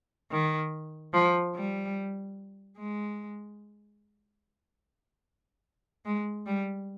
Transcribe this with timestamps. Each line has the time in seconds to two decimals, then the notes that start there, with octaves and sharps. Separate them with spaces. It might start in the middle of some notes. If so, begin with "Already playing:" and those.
0.32 D#3
1.14 F3
1.55 G3
2.78 G#3
6.05 G#3
6.46 G3